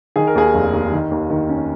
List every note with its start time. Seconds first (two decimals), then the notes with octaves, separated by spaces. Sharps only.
0.16 D#3 G#4
0.27 A#4
0.35 D#2 G#4
0.54 F1
0.73 D#2
0.92 D#3
1.11 D#2
1.30 D#3
1.49 C#4